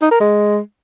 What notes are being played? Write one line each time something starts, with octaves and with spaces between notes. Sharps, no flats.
D#4
A#4
G#3